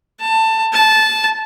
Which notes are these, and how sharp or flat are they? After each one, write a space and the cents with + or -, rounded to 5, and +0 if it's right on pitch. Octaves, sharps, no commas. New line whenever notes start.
A5 +20
A5 -15